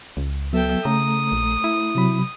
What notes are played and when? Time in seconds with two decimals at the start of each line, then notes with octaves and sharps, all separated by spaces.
0.17 C#2
0.53 F#3 B3 A4 E5 G5
0.85 C#3 A3 A#5 D#6
1.32 A#1
1.64 E4
1.95 C3 F#3 B5